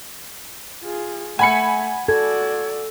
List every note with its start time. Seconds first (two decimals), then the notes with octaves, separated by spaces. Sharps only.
0.84 F4 G#4
1.39 A3 F#5 G#5 B5 C#7
2.08 F#4 A4 D5 G#6